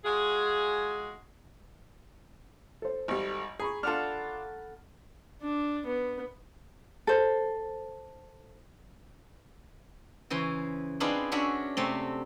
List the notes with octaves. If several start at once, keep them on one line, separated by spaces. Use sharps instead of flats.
G#3 F4 F#4 G#4
A4 C5
G#1 G3
G#4 A#5 B5 C#6
D4 F4 A4 F#5 F6
D4
B3
A4 C5
C#3 E3 C5 C6
C4 D4 D#4 F4 G#4 B4
C#4 D4 F#4 E5
C3 A3 C4